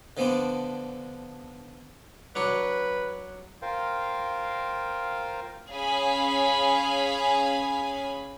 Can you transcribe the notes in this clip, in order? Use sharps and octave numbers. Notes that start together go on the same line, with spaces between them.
D3 F3 B3 C4 D4
F#3 D4 B4 C#6
F4 A#4 C5 F5 G5
C#4 G#4 F5 G#5 B5